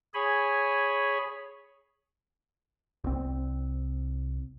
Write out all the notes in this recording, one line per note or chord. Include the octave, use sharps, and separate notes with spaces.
G#4 C#5 G#5 B5
C2 C4